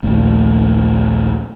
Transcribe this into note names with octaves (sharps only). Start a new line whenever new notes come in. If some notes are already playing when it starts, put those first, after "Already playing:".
A#1 D#2 A3